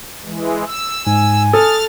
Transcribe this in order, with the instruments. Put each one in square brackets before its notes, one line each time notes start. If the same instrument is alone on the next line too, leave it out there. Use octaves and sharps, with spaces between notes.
[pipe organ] E3 G#3
E6
[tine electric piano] G#2 [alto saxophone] G#5
[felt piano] A4 [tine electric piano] D#6 [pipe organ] F6 A6